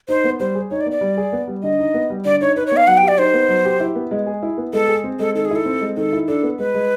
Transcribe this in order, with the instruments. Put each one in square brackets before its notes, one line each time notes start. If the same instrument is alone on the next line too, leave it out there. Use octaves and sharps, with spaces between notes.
[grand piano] D#4 [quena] C5
[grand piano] B3
[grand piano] G3 [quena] C5
[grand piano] G#4
[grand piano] D#4 [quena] C#5
[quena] D5
[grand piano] B3
[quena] D5
[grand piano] G3
G#4
B3
G3
[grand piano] D3 [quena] D#5
[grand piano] D#4
B3
G3
[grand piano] D3 [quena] D5
[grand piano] D#4 [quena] C#5
[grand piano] D#4 [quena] B4
[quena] C#5
[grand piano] B3
[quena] F5
[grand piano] F#3 [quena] F#5
[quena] G5
[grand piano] G4
[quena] D5
[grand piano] D#4 [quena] C5
[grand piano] B3
F#3
G4
E4
B3
G#3
G#4
E4
B3
[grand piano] G#3 [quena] A4
[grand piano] G#4
C4
[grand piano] G#3 [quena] A4
[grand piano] D#3 [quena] A4
[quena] G#4
[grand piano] E4 [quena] A4
[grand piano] C4
G#3
[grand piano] D#3 [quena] A4
[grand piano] E4
[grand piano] D4 [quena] A4
[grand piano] B3
[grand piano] G#3 [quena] B4
[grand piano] G#3